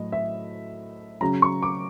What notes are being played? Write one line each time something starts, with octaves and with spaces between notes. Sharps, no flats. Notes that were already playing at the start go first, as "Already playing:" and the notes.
Already playing: A2 F#3 D#5
E5
C#3 F#3 A#5
C#6
D6